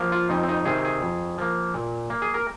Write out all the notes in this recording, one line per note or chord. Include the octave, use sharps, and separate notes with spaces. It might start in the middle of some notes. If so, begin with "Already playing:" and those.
Already playing: F3 A#3
F4
F2 D#4
C4
D#4
C3 D#3 C4 G#4
G#4
F2
F3 A#3
A#2
A#3
G#4
A#4